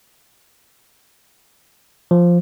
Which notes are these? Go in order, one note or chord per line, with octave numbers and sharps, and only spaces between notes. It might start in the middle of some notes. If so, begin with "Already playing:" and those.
F3